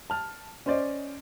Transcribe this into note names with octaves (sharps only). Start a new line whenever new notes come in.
A5 F6
C#4 C5 D5 D#5